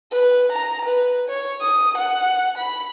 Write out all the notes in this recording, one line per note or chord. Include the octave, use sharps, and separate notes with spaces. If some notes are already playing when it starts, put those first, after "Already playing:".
B4
A#5
B4
C#5
D#6
F#5
B5